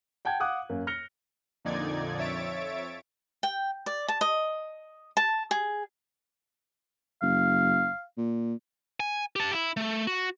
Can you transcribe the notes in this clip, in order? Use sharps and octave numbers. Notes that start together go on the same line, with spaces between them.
F#5 G5 A5 G6 G#6
F5 F#5 D6 D#6 F#6
F#2 A#3
F6 A#6 C#7 F7 G7
F2 A#2 D3 D#4 D5 G#6
F2 C#5 E5 A6 D7
G5
D5
A5
D#5
A5
G#4
F#1 F5
A#2
G#5
G4 A5
E4
A3
F#4